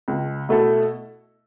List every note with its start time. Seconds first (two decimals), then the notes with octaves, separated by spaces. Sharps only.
0.08 C#2
0.49 B2 A3 E4 A4